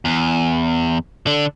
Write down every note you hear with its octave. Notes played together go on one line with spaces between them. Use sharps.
E2
D3 D4